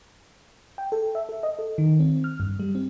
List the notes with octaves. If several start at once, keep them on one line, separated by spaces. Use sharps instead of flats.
G5
A4
E5
A4
D#5
A4
D#3
C4
F6
G2
G3
C4